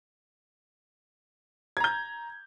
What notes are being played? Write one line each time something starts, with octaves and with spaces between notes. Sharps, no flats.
A#5 G6 G#6